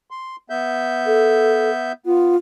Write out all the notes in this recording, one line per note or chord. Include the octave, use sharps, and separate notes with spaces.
C6
B3 E5 G6
A4
B3 F4